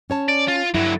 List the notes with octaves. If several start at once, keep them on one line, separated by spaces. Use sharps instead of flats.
C#4 C#5 A5
D5
F4
G2 D3 F#3 E4